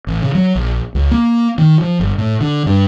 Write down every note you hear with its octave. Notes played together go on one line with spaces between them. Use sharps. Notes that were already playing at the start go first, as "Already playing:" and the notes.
A1
C#3
F#3
A#1
C#2
A#3
D#3
F3
G1
A2
D3
G2